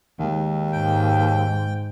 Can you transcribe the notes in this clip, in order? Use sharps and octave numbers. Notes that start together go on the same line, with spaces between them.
D#2 D#3 G#3
G#2 G5